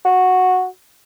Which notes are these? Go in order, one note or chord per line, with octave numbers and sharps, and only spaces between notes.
F#4